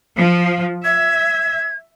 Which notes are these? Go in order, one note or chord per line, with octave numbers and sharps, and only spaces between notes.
F3
E5 G#6